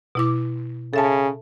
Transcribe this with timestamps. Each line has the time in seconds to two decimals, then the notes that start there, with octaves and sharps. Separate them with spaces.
0.15 B2 E4 D6
0.93 C#3 A4 E5 A5